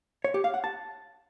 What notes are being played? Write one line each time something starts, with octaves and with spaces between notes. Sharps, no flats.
C#5
G4
F5
F#5
A5